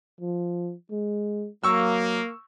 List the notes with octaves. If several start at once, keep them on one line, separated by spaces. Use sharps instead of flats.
F3
G#3
F#3 A#3 C#6 E6